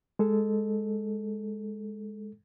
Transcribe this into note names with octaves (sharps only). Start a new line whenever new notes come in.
G#3 A4